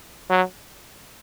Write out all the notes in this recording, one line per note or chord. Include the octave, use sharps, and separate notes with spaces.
F#3